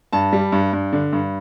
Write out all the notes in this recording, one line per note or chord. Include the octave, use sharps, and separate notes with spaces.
G2 A5
G3
G2
G2
D3
G2